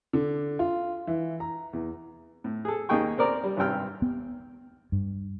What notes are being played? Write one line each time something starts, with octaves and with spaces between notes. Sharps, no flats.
D3
F4
E3
A#5
E2
A2
G#4 A4
D#2 A#3 D#4 G#4 G5 C#6
C4 A#4 D5 A#5
G3
G#1 G2 C3 G5 F6
B3
G2